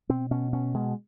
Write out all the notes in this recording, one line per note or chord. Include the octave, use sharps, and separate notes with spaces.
B2 C4
B2 C#4
B2 C#4
B2 G#3